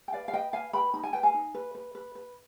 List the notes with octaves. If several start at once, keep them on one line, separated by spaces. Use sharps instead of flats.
G5
B4 D5 F5
F5
B4 D#5 G5
B4 F5 G#5
B4 G5 B5
D#4 B5
G#5
B4 G5
F5 G#5
D#4
B4
B4
B4
B4